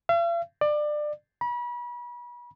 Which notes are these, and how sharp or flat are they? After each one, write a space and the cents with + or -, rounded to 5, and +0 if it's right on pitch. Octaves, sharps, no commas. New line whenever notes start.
F5 -45
D5 +25
B5 -35